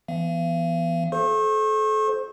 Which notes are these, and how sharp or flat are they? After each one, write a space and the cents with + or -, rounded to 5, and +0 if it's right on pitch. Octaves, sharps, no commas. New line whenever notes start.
E3 +35 B3 +0 F5 -45
A4 -35 C5 +0 C#6 -40